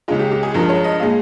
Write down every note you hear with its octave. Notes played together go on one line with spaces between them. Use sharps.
C#2 C#3 G#3 F4
G4
G4
G#4
G2 F3 G#3 A#4
C#5
D#5
A#2 G#3 F5